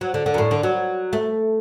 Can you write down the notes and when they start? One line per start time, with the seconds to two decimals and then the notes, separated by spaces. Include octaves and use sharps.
0.01 F#3
0.14 D3
0.26 D3
0.34 F#2
0.38 A2
0.51 D3
0.63 F#3
1.13 A3